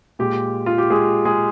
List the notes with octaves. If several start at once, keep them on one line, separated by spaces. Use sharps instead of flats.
A#2 G#3 G4
F4
G4
G#3 G#4
G#3 G#4